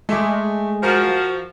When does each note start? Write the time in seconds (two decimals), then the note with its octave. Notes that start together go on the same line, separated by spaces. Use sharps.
0.09 G#3 A3 E5 D6
0.83 F3 F#4 A#4